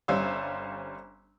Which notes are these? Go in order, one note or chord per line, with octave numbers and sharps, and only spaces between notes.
G1 G3 C#4 C5 F5 E6